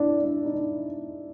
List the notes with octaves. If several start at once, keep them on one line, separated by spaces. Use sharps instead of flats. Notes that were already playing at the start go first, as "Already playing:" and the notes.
Already playing: D4 E4
D4
D#4
D4